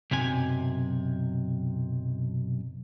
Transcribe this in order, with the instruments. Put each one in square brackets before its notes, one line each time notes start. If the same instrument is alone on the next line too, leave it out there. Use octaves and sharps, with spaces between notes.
[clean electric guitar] B1 F#2 C3 G#5